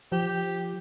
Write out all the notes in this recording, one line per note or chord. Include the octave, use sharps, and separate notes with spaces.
F3 G4